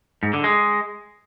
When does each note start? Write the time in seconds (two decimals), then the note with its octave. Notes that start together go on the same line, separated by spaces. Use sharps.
0.23 G#2
0.33 D3
0.44 G#3